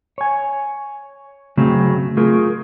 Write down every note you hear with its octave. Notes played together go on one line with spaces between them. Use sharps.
C#5 G#5
C#3 F#3 A3 C4
A3 F4 G#4 A#4